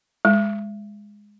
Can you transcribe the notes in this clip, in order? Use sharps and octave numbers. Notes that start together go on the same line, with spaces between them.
G#3